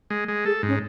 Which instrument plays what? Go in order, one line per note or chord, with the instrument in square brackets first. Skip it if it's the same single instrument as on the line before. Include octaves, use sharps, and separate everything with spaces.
[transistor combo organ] G#3
G#3
[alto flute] G#4 [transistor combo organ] A4
[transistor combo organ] G#2 [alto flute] C#4